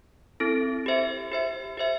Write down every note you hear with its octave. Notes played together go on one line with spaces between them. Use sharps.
C4 E4 A4
G4 C5 E5
G4 C5 E5
G4 C5 E5